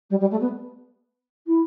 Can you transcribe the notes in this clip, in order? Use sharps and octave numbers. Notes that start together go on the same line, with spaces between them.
G3
G3
A3
B3
E4